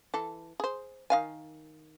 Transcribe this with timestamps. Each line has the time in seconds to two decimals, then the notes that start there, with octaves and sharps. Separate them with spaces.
0.14 E3 A4
0.60 G#4 C5
1.10 D#3 F5 G#5